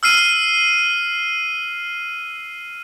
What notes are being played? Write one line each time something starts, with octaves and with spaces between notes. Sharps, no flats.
E6 F6 C7 D#7